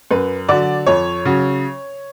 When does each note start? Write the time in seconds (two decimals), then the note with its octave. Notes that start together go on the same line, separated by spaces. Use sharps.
0.11 F#2 B4
0.49 D3 F#3 D5
0.87 F2 C#5
1.25 C#3 F#3